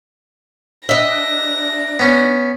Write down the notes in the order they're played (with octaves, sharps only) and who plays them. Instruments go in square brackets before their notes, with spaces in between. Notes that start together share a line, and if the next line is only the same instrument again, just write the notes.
[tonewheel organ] D4 [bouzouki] D#5 E5 [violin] A#6
[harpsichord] B3 C#4